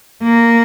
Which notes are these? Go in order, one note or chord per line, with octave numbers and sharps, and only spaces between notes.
A#3